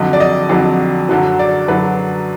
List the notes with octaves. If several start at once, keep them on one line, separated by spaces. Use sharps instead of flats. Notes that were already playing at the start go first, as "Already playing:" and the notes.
Already playing: F2 D3 F#3 D#5
D5
D#5
F2 D3 F#3
F#2 D3 F#3
D5
F#2 D3 F#3 B4